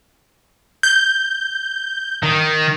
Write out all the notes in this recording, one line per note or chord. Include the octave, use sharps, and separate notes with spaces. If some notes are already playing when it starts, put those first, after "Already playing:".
G6
D#3